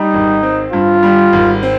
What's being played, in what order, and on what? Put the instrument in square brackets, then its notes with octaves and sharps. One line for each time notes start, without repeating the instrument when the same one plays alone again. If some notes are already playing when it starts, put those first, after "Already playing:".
Already playing: [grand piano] G3 [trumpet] D#4
[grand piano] G#1
C4
[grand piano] G2 [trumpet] F4
[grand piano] G3
G#1
C4